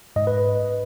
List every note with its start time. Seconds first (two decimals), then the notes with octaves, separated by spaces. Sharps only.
0.16 G#2 D#5
0.27 B4